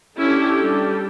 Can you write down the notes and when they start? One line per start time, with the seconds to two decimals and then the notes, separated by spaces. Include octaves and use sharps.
0.17 C#4 D4 E4 G4 A4
0.61 G3